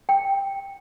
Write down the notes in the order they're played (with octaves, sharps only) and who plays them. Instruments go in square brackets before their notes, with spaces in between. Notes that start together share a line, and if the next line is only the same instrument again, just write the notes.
[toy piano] G5